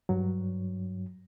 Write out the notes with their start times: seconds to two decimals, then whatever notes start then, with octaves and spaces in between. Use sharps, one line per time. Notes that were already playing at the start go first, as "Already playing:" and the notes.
0.09 G2 F#3